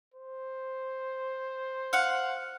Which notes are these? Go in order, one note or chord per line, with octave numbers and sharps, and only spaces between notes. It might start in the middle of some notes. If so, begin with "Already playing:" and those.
C5
F5 F#5